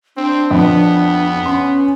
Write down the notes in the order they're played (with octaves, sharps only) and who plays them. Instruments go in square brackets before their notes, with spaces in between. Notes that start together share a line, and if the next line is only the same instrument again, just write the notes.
[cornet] C4 [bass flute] D4
[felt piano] F2 [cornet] B3
[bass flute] C#4 [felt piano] C6